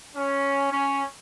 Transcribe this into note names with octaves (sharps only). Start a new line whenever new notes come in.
C#4
C#4